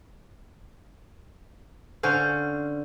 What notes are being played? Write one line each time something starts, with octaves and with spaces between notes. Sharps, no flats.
D3 C#4 C5 F5